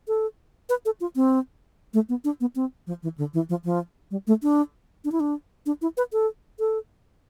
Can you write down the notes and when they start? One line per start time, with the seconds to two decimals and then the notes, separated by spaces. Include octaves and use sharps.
0.08 A4
0.69 B4
0.85 A4
1.00 F4
1.16 C4
1.94 A3
2.09 B3
2.24 D4
2.40 B3
2.56 C4
2.87 F3
3.03 E3
3.18 D3
3.34 E3
3.49 F3
3.65 F3
4.11 G3
4.27 A3
4.43 D4
5.05 D4
5.12 E4
5.20 D4
5.66 D4
5.82 E4
5.97 B4
6.12 A4
6.59 A4